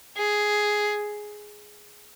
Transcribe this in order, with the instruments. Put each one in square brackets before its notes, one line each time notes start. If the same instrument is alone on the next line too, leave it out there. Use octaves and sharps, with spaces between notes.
[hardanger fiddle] G#4